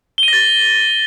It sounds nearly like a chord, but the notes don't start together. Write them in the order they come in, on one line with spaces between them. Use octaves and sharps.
G7 D#7 A#6 A6